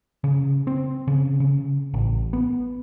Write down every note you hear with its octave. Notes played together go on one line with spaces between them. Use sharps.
C#3
C4
C#3
C#3
A1
B3